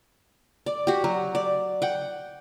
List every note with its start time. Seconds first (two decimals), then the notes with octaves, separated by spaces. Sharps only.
0.66 D5
0.87 F#4 G4
1.04 F#3
1.35 D5
1.82 F#5 G5